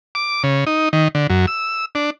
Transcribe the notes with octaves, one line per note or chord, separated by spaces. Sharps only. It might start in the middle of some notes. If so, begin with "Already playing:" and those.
D6
C#3
D#4
D#3
D3
F#2
E6
D4